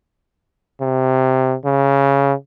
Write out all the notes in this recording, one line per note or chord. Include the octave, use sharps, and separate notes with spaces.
C3
C#3